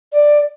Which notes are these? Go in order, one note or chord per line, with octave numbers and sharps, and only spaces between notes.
D5